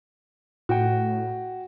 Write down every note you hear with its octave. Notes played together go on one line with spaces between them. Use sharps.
A2 F#4 G5